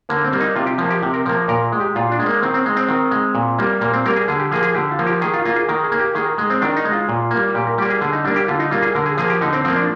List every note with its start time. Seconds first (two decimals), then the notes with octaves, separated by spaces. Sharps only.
0.09 D3 A#3
0.24 C4
0.32 G3 A#3
0.41 D#4
0.55 C3 F4
0.67 G4
0.78 F3 A#3
0.90 G4
1.03 C3
1.14 A#4
1.25 F3 A#3 A#4
1.48 A#2 A#4
1.72 G#3
1.80 G4
1.95 A#2 F4
2.12 D4
2.19 G#3
2.26 A#3
2.42 D#3 C4
2.54 C4
2.66 G#3
2.77 C4
2.89 D#3
3.11 G#3
3.35 A#2
3.59 G3 A#3
3.81 A#2 A#3
3.93 C4
4.05 G3 A#3 A#4
4.16 G#4
4.28 D3 G#4
4.40 G4
4.51 F3 A#3 G#4
4.63 G#4
4.74 D3 G4
4.91 F4
4.99 F3 A#3
5.07 G4
5.22 D#3 G#4
5.33 F4
5.45 A#3 F4
5.56 G#4
5.69 D#3 A#4
5.84 G#4
5.92 A#3
6.00 G4
6.15 D#3 G#4
6.26 A#4
6.38 G#3
6.50 C4
6.62 D#3 D4
6.76 D#4
6.85 G#3
6.92 F4
7.09 A#2
7.31 A#3
7.36 G3
7.54 A#2 G4
7.67 A#4
7.78 G3 A#3 G4
7.90 G#4
8.01 D3 G#4
8.13 D#4
8.25 G3 A#3 D4
8.36 G4
8.48 D3 F4
8.60 D#4
8.71 G3 A#3 F4
8.82 G#4
8.95 D3 A#4
9.06 G#4
9.17 F3 A#3 G#4
9.30 G4
9.41 D3 D#4
9.53 C4
9.65 F3 A#3 C4
9.76 D4